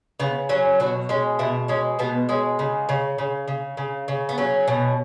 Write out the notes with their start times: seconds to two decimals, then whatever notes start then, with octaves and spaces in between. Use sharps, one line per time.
0.20 C#3 B3
0.49 F#3 C#4
0.80 B2 F#4
1.09 G#3 C#4
1.39 B2 E4
1.68 G#3 C#4
1.99 B2 B3
2.29 G#3 C#4
2.59 C#3
2.89 C#3
3.18 C#3
3.48 C#3
3.77 C#3
4.08 C#3
4.29 B3
4.38 F#3 C#4
4.68 B2